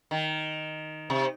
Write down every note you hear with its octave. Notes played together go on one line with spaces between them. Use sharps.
D#3
C3